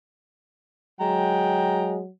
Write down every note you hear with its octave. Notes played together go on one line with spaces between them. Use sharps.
F#3 G#3 G5 A#5